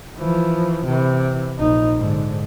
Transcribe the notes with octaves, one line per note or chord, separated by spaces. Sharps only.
E3 F3
C3 E3
A#1 D#4
G#2 D3